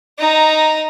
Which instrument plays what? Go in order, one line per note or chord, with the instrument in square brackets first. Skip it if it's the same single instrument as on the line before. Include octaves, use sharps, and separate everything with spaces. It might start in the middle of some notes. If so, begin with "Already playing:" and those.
[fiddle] D#4 A#5